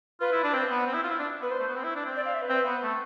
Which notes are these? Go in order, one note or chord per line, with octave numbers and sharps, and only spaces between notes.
F4 B4
E4
D4
C4
B3
C4
E4
F4
E4
D4
B3 B4
C5
A3
B3
C4
E4
D4
C4
D5
F5
E5
B4
C4
B3
A3